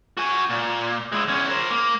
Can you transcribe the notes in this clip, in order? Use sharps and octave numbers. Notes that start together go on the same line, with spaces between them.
F#4 G#5
A#2
G#3 E4
E2 C#4
A#4 C5
A#3